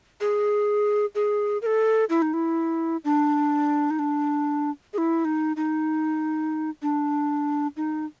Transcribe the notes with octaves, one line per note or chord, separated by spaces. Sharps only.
G#4
G#4
A#4
A4
E4
D#4
E4
D4
D#4
D4
G#4
E4
D#4
D#4
D4
D#4